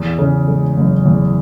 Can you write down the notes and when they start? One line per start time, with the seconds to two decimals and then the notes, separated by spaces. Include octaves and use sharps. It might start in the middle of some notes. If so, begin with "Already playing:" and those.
Already playing: E2
0.19 C#3
0.48 G#3
0.77 F#1
1.06 E2